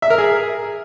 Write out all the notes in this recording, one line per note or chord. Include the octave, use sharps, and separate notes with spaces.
E5
A#4
G#4